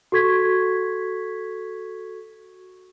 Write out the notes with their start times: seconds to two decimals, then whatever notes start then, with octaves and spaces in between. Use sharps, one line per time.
0.12 F#4 A4 C#6 G#6 B6